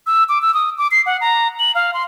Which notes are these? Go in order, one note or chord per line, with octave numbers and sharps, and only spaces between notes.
E6
D6
E6
D#6
D6
C7
F#5
A#5
F#7
F5
C6